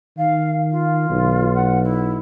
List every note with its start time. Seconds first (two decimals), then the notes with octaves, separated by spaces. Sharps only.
0.18 D#3 F5
0.71 F4
1.10 B1
1.55 F#5
1.83 E4